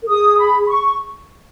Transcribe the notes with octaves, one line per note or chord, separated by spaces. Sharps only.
A#4
G#4 D#6
B5
B5
C#6